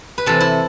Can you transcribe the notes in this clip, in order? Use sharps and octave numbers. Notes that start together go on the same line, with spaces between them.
B4
C3 E3 A3 A4
E4